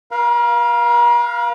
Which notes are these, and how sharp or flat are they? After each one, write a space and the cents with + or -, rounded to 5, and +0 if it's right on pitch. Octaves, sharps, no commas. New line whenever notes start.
A#4 +45 F5 +0 B5 -15